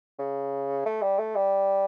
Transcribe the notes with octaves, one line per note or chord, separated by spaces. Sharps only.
C#3
A3
G3
A3
G3